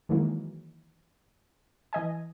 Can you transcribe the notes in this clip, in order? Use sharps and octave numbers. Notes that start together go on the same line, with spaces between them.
D#3 E3 F#3 G#3 A#3
E3 D#5 G#5